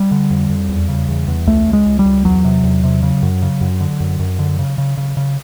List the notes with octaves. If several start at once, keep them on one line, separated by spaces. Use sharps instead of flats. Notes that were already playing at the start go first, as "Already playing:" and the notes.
Already playing: G3
D3
F2
F2
E2
C#3
E2
E2
C#2 A3
C#2
G#3
C#2
G3
C#2
E2 F#3
C3
E2
C3
C#3
F#2
C#3
F#2
D3
F#2
F#2
D3
C#3
C#3
C#3
C#3